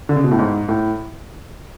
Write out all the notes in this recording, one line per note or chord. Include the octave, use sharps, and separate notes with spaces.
D3
C#3
B2
A2
G#2
A2